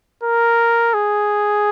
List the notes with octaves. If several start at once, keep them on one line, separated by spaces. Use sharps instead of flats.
A#4
G#4